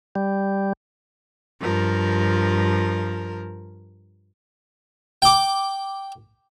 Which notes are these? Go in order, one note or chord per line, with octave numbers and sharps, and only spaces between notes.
G3
G2 F3 A#4
G5 D6